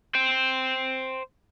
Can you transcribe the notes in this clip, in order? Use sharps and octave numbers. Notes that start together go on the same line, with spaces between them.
C5 G5